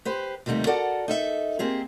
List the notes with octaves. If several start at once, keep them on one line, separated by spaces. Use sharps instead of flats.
G4 B4 C5
D#2 C3 G3 A3 D#4
F#4 A4 A#4 D5 F#5
D#4 A4 E5
A#3 C4 G4 G#4